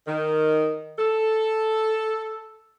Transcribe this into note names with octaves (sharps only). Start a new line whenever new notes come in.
D#3
A4